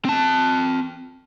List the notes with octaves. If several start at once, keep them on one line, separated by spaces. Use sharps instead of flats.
C4 A5